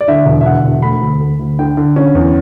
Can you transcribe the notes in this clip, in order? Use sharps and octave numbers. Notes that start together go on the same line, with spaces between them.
D5
D3 E5
E1
E5
D3 F#5
E1
A3 B5
D2
A3
D2
D3 G5
D3
C#4
E2